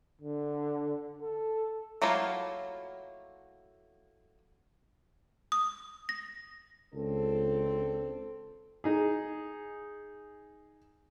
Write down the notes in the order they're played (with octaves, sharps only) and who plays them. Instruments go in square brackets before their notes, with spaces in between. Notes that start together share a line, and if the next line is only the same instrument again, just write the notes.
[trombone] D3
A4
[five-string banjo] F#3 A3 A#3 E4 F4
[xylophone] D#6
A#6
[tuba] C#2 [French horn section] C4 D4 A4
[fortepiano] D#4 G#4